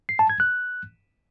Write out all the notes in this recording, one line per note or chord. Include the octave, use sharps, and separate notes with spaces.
C7
A5
G#6
F#6